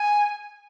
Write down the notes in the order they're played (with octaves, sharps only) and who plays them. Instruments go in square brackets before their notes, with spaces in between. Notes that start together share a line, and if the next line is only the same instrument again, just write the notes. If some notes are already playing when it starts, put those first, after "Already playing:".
Already playing: [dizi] G#5